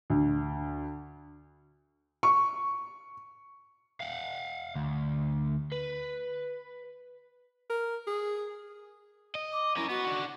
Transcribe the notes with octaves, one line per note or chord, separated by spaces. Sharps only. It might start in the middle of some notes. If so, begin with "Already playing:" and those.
D2
C#6
F5 F#5
D2
B4
A#4
G#4
D#5
D6
C#4 E4 A#4
B3 F#4
D4 F#5